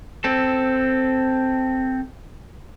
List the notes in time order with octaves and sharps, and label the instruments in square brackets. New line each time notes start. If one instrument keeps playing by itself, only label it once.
[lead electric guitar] C4 A4